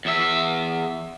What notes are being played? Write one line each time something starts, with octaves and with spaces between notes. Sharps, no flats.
E2 E5